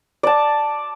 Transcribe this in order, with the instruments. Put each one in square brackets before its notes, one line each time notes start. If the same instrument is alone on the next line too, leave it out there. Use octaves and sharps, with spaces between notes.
[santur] D5 A5